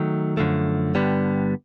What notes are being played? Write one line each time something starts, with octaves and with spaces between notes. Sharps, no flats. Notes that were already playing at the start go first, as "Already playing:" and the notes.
Already playing: D#3 F#3 A3
F#2 D3 F3 A3
G2 D3 G3 B3 D4